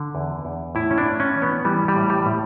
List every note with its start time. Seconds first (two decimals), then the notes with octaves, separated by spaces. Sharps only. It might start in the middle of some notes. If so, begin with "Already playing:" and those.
Already playing: D3
0.15 E2
0.45 E2
0.75 A2 E4
0.91 C#4
0.98 D4
1.06 A2
1.20 C#4
1.35 E3
1.42 B3
1.65 E3 G3
1.88 G3
1.96 A2
2.10 G3
2.26 A2